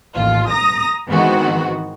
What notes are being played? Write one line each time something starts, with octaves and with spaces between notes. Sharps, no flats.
A1 D#2 F4
A#5 D#6 A#6
G#2 D#3 E3 B3 C4 F#4